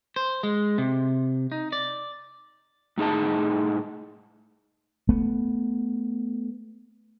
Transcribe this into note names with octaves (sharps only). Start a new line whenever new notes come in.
C5
G#3
C3
D#4
D5
A2 D#4 G#4 D#5 A5
A3 B3